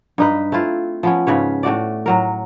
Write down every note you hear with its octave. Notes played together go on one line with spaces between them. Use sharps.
G2 D#4 B4
A3 C4 E4 F4
F3 B3 C#4
G#2 C#3 B4 C#5
A2 A3 F#4 D5
A2 F#3 A#4